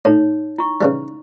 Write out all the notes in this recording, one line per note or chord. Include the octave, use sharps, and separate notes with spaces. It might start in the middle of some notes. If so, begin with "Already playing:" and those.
A2 D#4 C#5
E4 C#6
C#3 E3 G3